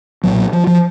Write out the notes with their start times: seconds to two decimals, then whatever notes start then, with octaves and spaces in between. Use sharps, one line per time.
0.23 B1 A#2 F#3
0.53 F3
0.67 F3